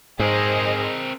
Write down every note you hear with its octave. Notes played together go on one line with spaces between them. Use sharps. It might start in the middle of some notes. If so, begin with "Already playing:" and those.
G#2 C4 G#4 A#4 C5 D#5